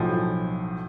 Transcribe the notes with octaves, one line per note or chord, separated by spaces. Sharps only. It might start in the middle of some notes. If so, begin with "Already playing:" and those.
Already playing: B1 A2 F3